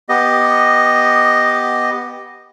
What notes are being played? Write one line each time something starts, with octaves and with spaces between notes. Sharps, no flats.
B3 G4 D#5